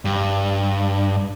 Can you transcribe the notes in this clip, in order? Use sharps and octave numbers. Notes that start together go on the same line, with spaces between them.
G2